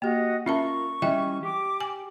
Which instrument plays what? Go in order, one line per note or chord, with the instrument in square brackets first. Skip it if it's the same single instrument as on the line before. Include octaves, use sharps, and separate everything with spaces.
[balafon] A#3 G4 [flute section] F#4 D#5
[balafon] C#4 E5 A5 [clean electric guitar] F4 A#4 [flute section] C#6
[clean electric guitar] E3 G3 C#4 [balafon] D#5 E5 G5
[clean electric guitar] G4 [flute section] D6
[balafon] G#5